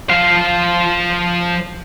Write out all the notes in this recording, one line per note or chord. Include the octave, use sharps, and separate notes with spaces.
F3 F5